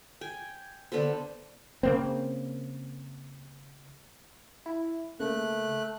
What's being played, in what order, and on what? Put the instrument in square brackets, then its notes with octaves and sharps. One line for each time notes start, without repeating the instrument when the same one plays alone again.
[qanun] G5 G#5
D3 B3 A4 C5
[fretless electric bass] C#3 A#3 C4
[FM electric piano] E4
[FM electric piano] C#3 A#3 [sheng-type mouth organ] A3 F#6